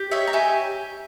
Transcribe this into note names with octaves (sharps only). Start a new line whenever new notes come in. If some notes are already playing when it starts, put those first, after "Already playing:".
Already playing: G4
D#4 C#5 E5
A#5
G4 E5 G#5